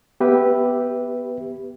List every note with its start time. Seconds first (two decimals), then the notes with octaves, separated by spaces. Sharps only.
0.20 B3 G4 B4 E5